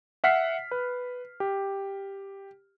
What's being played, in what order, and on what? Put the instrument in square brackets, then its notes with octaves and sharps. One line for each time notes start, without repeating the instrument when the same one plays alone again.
[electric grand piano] E5 F#5 F6 B6 C7
B4
G4